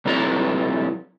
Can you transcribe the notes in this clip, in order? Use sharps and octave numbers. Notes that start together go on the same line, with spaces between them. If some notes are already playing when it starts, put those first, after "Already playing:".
B2 F#3 C4 E4 A4 A#5